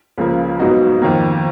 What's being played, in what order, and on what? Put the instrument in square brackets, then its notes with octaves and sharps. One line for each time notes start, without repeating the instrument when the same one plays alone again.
[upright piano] C#2 C#3 F3 A#3
G#2 F#3 B3 D#4 F#4
F2 D#3 A#3